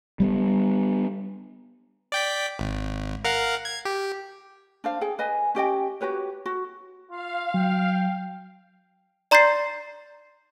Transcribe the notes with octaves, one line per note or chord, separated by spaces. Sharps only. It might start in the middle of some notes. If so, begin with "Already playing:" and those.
G3 A3 B3
D5 G5 B6
G#1
A#4 F5 F#5
G#6
G4
D4 C5 F5
G#4 G5
B4 D#5 G#5
C#4 G4 D#5 G5
F#4 G4 B4 C#5
F#4
F4 F5
F#3 G5
D5 A#5 C6 G6 A6 C7